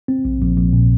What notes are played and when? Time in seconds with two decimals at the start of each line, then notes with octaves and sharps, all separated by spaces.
0.08 C4
0.25 A#1
0.41 A#1
0.57 A#1
0.73 A#2